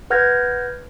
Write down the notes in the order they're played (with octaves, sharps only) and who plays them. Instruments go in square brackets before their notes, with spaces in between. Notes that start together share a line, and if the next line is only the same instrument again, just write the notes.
[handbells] B4 F#5 F6 G6 G#6 A#6